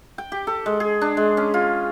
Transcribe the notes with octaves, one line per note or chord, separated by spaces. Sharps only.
G5
G4
A4
G#3
G#4
D4
G#3
C#4
F4